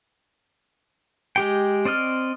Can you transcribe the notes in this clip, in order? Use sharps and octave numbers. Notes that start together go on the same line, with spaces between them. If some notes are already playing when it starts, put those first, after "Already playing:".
G#3 G4 G5
C4 D5 D#5 F6